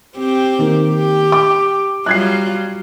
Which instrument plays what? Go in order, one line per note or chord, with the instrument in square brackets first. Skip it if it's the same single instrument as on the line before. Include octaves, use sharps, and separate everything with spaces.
[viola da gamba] C4 G4
[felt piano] D#3 A#3
[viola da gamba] G4
[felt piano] D6
[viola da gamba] F#3 G3 F4 [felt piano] F#6 G#6 C7